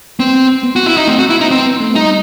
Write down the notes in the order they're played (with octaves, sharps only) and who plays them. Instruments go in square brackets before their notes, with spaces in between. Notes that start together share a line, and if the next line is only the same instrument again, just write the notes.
[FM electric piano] B3 [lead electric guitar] C4
[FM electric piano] B3
[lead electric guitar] F#4
E4
D#4
[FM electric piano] A3 [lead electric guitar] C4
[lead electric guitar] F#4
[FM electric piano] B3 [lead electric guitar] E4
[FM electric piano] C4 [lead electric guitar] D#4
[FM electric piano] B3 [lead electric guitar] C4
[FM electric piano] B3
A3
[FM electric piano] G3 [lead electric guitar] D#4